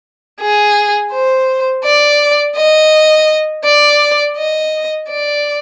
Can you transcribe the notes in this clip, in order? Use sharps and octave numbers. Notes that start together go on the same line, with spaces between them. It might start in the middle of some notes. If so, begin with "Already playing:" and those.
G#4
C5
D5
D#5
D5
D#5
D5